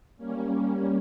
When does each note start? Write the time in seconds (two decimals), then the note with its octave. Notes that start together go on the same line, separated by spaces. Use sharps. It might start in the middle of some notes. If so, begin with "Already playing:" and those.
0.17 G3 A#3 C#4